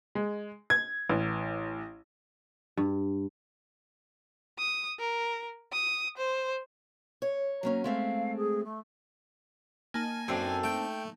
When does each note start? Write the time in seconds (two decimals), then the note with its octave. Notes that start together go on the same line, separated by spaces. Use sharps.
0.15 G#3
0.70 G#6
1.10 A1
2.77 G2
4.59 D#6
4.99 A#4
5.73 D#6
6.17 C5
7.22 C#5
7.63 F#3 A#3 C#4
7.84 G#3 A3 C4 F5
8.36 G#4
8.64 A3
9.94 A#3 D#4 G#5 A5
10.28 F#2 C4 D4 A4
10.64 A3 G5